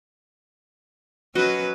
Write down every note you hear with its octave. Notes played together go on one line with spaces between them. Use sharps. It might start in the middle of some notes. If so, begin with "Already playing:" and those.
F#3 C#4 F#4 B4 D#5 F#5